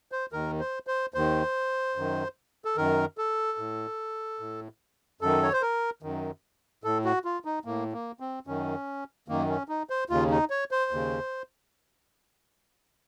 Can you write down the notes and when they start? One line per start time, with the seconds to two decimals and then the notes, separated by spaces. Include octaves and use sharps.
0.12 C5
0.32 D#2 D#3 A#4
0.60 C5
0.87 C5
1.14 D#2 D#3 C5
1.96 F#2 D#3
2.65 A4
2.77 F#2 D#3 A#4
3.18 A4
3.58 A2
4.40 A2
5.21 F#2 D#3 A4
5.43 C#5
5.53 C5
5.62 A#4
6.02 F#2 D#3
6.84 A2 A4
7.05 F#4
7.25 F4
7.45 D#4
7.65 A2 A#3
7.93 A#3
8.20 C4
8.47 F#2 D#3 C#4
9.28 F#2 D#3 A#3
9.49 C#4
9.69 D#4
9.90 C5
10.10 D#2 C#3 F4
10.30 D#4
10.50 C#5
10.71 C5
10.91 D#2 C#3